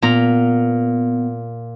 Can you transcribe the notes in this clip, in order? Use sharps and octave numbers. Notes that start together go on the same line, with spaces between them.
A#2 B3 A#5